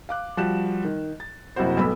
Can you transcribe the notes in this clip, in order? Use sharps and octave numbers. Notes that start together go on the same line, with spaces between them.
F5 D6 F#6
F3 G3 F#4 F#6 E7
D#3
A6
F#1 C3 E4 F#4 C5
B1 A2 B3 B5 E6